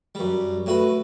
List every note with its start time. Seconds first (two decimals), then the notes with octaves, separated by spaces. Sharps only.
0.15 F#2 G3
0.66 A2 F#4 B4